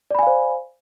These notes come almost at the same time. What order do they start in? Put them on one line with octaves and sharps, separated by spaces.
D5 B5 G#5 F5 C5